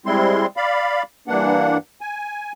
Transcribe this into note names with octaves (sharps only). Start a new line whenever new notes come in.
G3 G#3 C4 E4 C6
D5 F5 B5
G2 E3 A#3 D4 F#5
G#5